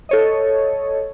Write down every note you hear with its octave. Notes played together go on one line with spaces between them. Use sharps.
A4 C#5 D#5